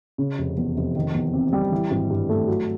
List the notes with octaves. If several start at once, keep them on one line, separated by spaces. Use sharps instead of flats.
C#3
F1
E2
F1
D#3
E2
C3
G3
E3
G#1
G2
A3
F#3